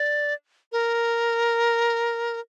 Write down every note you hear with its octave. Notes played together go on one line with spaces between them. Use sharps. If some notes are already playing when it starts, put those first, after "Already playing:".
Already playing: D5
A#4